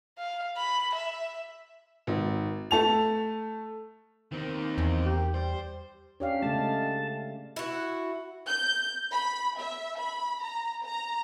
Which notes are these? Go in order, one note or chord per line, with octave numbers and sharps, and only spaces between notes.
F5
B5
E5
G#1
A3 A5 F7
D#3 A#3 C4
E2
G4
G3 C5
C#4 D4 G4 F5
C#3 G#3 A3 A5
E4 F#4
G6
B5
E5
B5
A#5
A#5